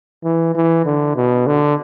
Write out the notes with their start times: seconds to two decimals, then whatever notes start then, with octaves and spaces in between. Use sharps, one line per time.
0.24 E3
0.55 E3
0.85 D3
1.16 B2
1.47 D3